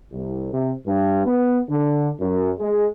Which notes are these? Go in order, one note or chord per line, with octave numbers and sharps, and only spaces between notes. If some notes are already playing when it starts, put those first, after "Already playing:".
C2
C3
G2
B3
D3
F#2
G#3